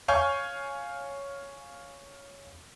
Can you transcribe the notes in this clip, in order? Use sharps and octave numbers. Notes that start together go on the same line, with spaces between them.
C#5 F5 G#5 C#6 F6 G6